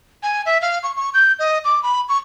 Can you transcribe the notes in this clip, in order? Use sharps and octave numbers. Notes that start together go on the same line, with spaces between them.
G#5
E5
F5
C#6
C#6
G6
D#5
D6
B5
C#6